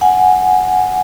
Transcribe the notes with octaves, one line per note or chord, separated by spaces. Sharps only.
F#5 G#5